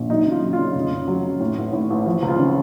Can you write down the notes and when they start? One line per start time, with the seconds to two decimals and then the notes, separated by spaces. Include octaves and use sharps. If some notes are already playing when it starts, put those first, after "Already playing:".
Already playing: A#1
0.10 F#3 D#4
0.26 C#3
0.31 F4
0.42 F#3
0.53 F4
0.58 C#3
0.75 F1
0.91 C#3
1.08 F#3
1.24 F#3
1.40 A2
1.57 A1
1.73 A2
1.90 A1
2.06 F3
2.22 C#2
2.28 F4
2.39 C#3